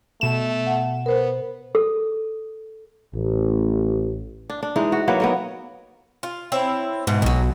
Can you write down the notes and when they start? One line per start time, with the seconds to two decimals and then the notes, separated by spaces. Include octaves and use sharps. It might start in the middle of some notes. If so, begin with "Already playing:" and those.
0.21 B2 A3 E7
0.67 F#5
1.06 B3 A#4 C5
1.75 A4
3.15 A1
4.50 D4
4.63 D4
4.76 E3 G#3 D#4
4.92 F#4
5.08 F#3 A#3 B4 C#5
5.20 B3 A#4 D#5
6.23 F4
6.52 C4 E4 C#5
7.07 G#2 B2 E3
7.22 B1 B2 D#3 F#3